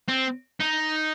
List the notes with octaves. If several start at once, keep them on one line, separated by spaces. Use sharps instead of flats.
C4
D#4